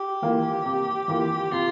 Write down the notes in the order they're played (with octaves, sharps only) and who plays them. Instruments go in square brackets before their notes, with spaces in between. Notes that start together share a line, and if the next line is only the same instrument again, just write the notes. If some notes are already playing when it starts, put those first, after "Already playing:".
Already playing: [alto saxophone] G4
[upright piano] E3 A#3 F4
C3
E3 A#3 F4
[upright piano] C3 [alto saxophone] F4